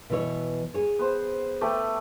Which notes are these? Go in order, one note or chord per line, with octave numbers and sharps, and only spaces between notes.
B2 E3 C#5
G#4 C#5
B3 C5
A3 G4 B4